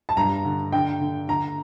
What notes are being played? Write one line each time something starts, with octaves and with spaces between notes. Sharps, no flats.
A5
G2 A#5
D3
D3 G5
D3
D3 A#5